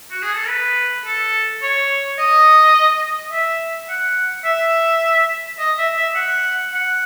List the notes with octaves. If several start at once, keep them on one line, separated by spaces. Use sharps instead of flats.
F#4
G#4
A4
B4
A4
C#5
D#5
E5
F#5
E5
D#5
E5
E5
F#5
F#5